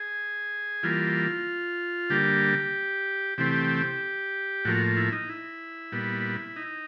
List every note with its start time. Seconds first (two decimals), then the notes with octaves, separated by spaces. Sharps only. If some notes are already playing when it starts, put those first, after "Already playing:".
Already playing: G#4
0.83 E3 G3 A#3 F4
2.10 D3 G3 A#3 G4
3.38 C3 E3 A3 C4 G4
4.65 A2 F3 A#3 F#4
4.97 E4
5.12 D#4
5.29 E4
5.92 A#2 G3 B3
6.56 D#4